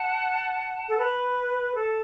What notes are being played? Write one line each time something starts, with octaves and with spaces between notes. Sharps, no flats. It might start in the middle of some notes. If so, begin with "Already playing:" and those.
Already playing: F#5 A5
A4
B4
A4